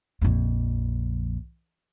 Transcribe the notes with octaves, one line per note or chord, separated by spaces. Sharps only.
A#1 F2